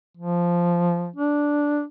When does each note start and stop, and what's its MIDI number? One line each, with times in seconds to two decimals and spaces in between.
0.17 1.11 53
1.16 1.84 62